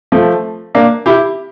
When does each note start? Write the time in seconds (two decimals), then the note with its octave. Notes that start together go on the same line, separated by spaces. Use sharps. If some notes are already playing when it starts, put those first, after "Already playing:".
0.12 F3 A3
0.75 A#3 D4
1.06 E4 G4